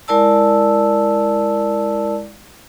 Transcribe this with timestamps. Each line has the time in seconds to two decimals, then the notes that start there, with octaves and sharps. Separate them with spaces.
0.08 G#3 E4 A#4 D5 A5 E6